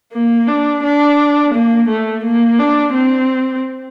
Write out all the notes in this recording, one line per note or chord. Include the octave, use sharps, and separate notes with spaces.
A#3
D4
D4
A#3
A3
A#3
D4
C4